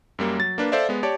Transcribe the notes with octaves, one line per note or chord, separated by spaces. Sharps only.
F#2 G3 A#3
F#3 A6
A#3 D4 B4
A4 C5 D5 E5 F5
G#3 B3
G4 C#5 D5 A5